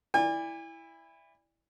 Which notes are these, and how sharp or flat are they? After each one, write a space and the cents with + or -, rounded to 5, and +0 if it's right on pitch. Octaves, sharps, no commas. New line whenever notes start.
E4 +0 D5 +0 G#5 -40